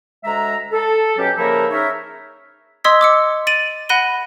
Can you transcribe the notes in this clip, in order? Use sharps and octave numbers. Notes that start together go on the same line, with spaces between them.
D2 G#3 E5 A#5
A4
B2 F#3 C#4 G4
C#3 F3 A#3 E4 A4 A#4
C#4 D#4 G#4 A#4 C#5 E5
D#5 C6 D#6 E6 G#6 B6
D6 E6 C#7
A6 D7 D#7 F#7
F#5 B5 F#6 A#6 D#7 G7